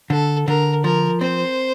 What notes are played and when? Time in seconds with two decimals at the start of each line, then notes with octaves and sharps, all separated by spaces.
0.10 D3 A4
0.48 D3 A#4
0.84 F3 A#4
1.21 C4 C5